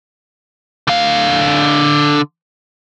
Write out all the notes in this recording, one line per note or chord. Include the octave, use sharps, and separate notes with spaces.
D3 F5